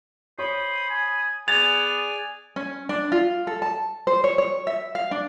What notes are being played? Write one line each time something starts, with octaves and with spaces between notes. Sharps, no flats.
C5 C#5 B5 D#6
G#5
B3 G#4 D5 G#5 A6 F7
C#4
D4
F4
A4
A5
C5
C#5
C#5
E5
F5
D4